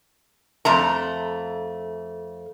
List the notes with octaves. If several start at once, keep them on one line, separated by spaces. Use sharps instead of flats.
F2 A3 A#5